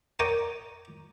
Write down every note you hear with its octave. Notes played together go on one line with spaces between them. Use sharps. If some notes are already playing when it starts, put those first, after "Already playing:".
A#4 C#5 D5 G5 D6 D#6